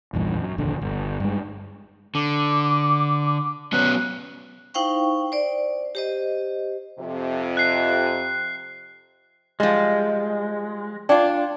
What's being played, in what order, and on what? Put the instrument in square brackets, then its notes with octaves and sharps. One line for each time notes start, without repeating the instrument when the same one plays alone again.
[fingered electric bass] A#1 E2 G2 A#2
F#2
F1 A#1 D#2 D3
G1
G2 G#3
[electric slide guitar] D3 [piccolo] D6
[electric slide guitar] F#3 B3 C#4 [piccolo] F#6
[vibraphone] D#4 E4 C5 F5 G5 C#6
C5 D5
G4 C5 D#5
[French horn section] F2 C3
[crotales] F#6 C7
[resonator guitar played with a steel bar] F3 G3 [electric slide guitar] G#3
[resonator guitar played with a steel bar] D4 F4 [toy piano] D5 G5